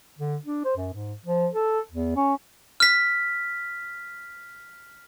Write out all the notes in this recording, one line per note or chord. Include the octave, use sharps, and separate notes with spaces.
D3
D4
C5
F#2
G#2
F3
A4
E2
C#4
F6 B6